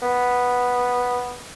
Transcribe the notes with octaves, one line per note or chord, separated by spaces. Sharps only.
B3